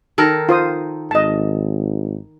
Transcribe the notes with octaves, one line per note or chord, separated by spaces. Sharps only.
D#3 A4 A#4
F4 C5 D#6
G#1 D#5 A5